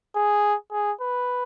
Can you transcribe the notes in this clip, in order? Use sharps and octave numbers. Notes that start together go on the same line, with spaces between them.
G#4
G#4
B4